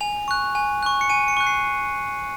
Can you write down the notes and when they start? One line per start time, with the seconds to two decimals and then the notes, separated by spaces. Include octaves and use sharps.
0.01 G#5 F7
0.28 C#6 F#6
0.55 G#5
0.83 C#6 F#6
1.01 C#7
1.09 G#5 D#7
1.28 C#7
1.37 C#6 F#6
1.47 C7